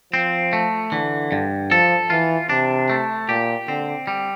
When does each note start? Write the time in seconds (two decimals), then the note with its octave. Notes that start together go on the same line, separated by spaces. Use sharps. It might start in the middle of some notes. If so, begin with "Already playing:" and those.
0.13 F3 C4
0.53 A3
0.92 D3 E3
1.32 G2
1.71 F3 A4
2.10 E3 F4
2.49 C3 D4
2.90 A3
3.28 A#2 G4
3.68 D3 C4
4.07 G3